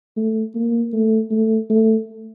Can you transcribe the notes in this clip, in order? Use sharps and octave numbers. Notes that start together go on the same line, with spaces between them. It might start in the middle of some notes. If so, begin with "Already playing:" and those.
A3
A#3
A3
A3
A3